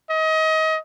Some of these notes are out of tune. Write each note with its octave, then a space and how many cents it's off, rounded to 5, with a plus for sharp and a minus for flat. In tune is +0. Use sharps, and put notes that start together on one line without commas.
D#5 +30